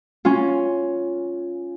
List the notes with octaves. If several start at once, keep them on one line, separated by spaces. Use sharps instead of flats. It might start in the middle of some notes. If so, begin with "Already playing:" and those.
C#4 F4